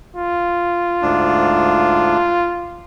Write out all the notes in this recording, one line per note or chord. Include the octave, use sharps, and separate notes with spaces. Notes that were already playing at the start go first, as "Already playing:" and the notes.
F4
D2 G#2 D4